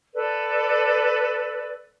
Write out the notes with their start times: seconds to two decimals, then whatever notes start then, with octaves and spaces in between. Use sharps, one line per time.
0.14 A4 B4 D5